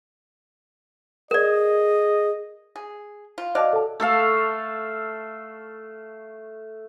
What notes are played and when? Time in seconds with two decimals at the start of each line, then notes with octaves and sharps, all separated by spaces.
1.31 G#4 A#4 D5 D#5
2.76 G#4
3.38 F4
3.55 F#3 D5 D#5 F5 A5
3.73 A4 A5
4.00 A3 A4 F5